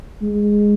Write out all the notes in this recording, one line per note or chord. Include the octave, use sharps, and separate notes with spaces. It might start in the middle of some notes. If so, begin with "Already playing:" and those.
G#3